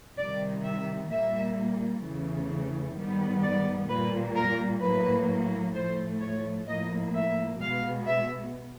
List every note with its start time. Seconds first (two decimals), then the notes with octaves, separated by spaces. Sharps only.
0.17 C3 D#3 G3 D5
0.64 E5
1.10 A#2 G3 A#3 E5
2.03 E2 C#3 E3 A3
2.96 G#2 D#3 G3 B3
3.42 D5
3.89 A#2 G3 A#3 B4
4.35 A#4
4.81 A2 F#3 A#3 B4
5.74 A2 F3 A3 C5
6.21 C#5
6.68 A2 F3 A#3 D#5
7.14 E5
7.60 B2 G#3 B3 F5
8.07 E5